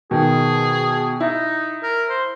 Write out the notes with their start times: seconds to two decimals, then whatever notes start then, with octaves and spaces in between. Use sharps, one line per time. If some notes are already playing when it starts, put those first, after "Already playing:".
0.11 B2 D#3 G#4
1.20 D#4 E4
1.83 A#4
2.09 C5